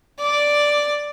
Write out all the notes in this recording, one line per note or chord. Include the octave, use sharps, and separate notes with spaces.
D5